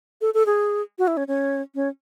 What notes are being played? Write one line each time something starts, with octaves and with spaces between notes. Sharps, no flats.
A4
A4
G#4
F#4
E4
C#4
C#4
C#4